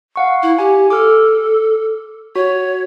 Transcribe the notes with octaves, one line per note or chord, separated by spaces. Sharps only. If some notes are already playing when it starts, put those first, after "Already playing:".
F5 F#5 C#6
E4
G4 G#5
A4 D6 F6
F#4 C#5